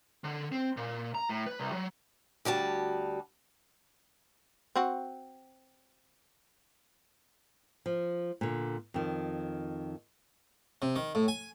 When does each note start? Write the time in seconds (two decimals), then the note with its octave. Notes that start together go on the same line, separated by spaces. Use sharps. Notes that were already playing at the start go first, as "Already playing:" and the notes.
0.24 D3
0.52 C4
0.77 A#2
1.15 A#5
1.29 A2
1.46 B4
1.60 C2
1.72 F#3
2.45 D2 G3 F#4 A5
4.75 C4 F#4
7.86 F3
8.41 A#2 D3
8.94 F2 D#3
10.82 C3
10.96 D#3
11.15 A2
11.28 G#5